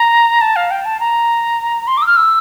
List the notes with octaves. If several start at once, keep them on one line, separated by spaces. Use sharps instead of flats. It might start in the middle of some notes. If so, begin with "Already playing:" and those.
Already playing: A#5
A5
F5
G5
A5
A#5
C6
D6
E6
F6
E6